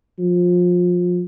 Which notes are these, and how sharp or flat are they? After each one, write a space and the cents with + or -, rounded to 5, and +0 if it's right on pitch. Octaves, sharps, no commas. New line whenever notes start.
F3 +25